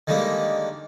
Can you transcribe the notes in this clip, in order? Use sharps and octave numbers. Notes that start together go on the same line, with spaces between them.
D3 D#3 G3 G#3 A#3